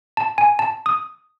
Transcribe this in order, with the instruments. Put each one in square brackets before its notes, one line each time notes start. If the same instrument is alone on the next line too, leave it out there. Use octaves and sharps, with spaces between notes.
[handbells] A5
G#5
A5
D#6